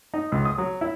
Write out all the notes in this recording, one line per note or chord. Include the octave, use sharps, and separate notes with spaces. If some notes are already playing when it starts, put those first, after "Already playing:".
D#4
C#2
D#6
F#3
E4